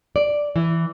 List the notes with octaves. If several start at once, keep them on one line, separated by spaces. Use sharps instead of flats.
D5
E3